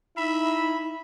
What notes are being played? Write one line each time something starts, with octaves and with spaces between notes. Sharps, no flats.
D#4 E4 E5 B5